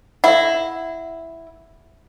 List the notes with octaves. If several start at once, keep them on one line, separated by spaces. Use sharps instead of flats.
E4 E5 F#5